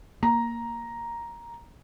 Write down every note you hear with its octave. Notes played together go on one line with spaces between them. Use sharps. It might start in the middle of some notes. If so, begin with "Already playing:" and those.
A#3 A#5